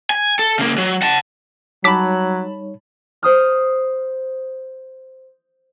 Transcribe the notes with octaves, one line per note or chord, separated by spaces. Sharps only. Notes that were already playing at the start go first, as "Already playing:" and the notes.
G#5
A4
C#3 A#3
F#3
F#5 A5
F#3 G3 D#4 C#5 A5 B5 D6 B6
C5 D#6 F6